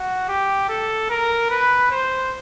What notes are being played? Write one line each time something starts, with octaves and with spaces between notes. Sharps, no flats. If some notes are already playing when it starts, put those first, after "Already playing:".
Already playing: F#4
G4
A4
A#4
B4
C5